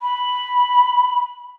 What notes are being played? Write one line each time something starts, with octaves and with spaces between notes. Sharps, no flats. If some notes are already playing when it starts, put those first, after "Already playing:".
B5